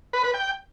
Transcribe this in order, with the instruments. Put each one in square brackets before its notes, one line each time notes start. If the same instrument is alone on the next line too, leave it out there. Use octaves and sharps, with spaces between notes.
[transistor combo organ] B4
B4
G5